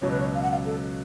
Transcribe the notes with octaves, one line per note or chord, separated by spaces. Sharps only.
C#2 B2 F#3 C#4 C#5
B4
C#5
F5
F#5
F5
A4